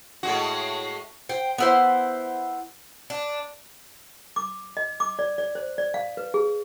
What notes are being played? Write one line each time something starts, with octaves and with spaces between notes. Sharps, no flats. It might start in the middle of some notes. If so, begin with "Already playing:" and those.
A2 G#3 F#4
C5 G5
B3 E4 C5
D4
D6
D#5
D6
D5
D5
C5
D5
F5
B4
G#4